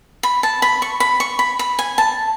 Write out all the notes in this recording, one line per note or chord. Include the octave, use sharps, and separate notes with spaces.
B5
A5
B5
C#6
B5
C#6
B5
B5
G#5
A5